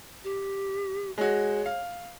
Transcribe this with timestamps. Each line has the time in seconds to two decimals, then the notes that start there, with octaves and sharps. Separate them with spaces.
0.24 G4
1.18 G#3 F#4 C#5
1.66 F5